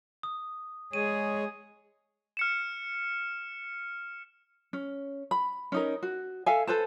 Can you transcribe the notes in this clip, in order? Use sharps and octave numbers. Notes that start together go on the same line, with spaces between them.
D#6
G#3 G#4 C#5 D#7
F6 C#7 E7
C#4
B5
C#4 D#4 A#4
F#4
A4 E5 F5 G#5
A4 B4 C5 A5